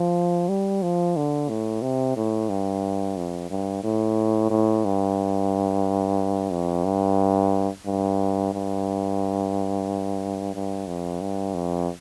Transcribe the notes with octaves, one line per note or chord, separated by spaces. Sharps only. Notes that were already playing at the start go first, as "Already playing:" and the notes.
Already playing: F3
G3
F3
D3
A2
C3
A2
G2
F2
G2
A2
A2
G2
F2
G2
G2
G2
G2
F2
G2
F2